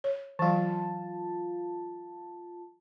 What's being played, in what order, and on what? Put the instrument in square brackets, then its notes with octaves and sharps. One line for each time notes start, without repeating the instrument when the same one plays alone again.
[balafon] C#5
[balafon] E3 F#3 [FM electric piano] F4 A5